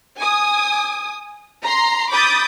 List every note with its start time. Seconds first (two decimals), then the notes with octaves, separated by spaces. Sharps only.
0.18 G#5 D#6
1.62 A#5 C6
2.11 B5 D6 D#6 G6 A6